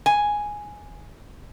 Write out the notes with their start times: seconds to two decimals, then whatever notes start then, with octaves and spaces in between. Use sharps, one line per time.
0.06 G#5